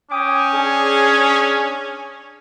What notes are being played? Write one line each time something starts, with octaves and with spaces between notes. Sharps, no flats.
C#4 G5 D6 D#6
D4 G#4